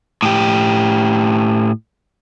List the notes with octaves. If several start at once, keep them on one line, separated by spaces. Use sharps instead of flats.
A2 G4